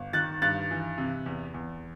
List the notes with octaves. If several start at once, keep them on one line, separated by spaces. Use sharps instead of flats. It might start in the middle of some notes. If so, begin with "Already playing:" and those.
Already playing: G1
D#3 F#6 A6
G2 F#6 A6
E3
C3
E2
E2